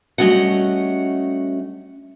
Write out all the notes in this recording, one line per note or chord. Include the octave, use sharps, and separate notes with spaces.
G3 A3 C#4 F#4 D#5 F#5